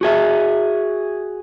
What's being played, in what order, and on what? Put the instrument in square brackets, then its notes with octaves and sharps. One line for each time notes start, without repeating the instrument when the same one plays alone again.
[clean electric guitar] F#4 G#4 E5